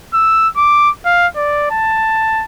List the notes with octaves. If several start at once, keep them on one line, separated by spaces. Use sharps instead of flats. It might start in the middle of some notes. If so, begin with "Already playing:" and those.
E6
D6
F5
D5
A5